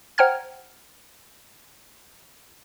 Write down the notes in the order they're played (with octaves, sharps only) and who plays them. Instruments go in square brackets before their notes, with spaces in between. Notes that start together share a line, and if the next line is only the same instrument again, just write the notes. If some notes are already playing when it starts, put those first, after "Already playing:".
[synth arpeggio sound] C5 F#5 G5 A#5 F6 G#6